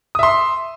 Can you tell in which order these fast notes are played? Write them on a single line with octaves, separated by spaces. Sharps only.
D#6 E5 C6